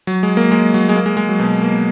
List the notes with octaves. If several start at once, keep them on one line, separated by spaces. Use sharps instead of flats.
F#3
G#3
A#3
G#3
F#3
G#3
A#3
G#3
G#3
F#3
B2
A#3